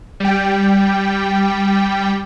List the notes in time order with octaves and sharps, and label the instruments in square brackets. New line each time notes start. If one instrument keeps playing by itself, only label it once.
[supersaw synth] G3 G5